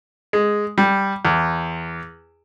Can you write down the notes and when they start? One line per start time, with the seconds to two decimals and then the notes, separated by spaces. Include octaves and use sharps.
0.33 G#3
0.78 G3
1.25 E2